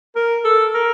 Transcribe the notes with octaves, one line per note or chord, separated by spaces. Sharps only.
A#4
A4
A#4